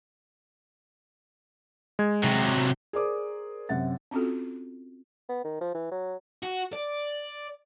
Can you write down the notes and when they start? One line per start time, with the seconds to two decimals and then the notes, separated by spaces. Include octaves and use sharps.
1.99 G#3 G#6
2.24 C3 F#3
2.93 G#4 A#4 C5 D5 D6 D#6
3.69 F#2 C3 C4 F#5 A6
4.11 C4 C#4 F4 F#4 A4
5.29 B3
5.44 D#3
5.61 F3
5.74 E3
5.91 F#3
6.43 F#4
6.73 D5